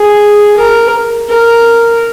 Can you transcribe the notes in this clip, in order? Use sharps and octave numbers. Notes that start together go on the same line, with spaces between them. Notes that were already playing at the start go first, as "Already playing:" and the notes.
Already playing: G#4
A#4
A#4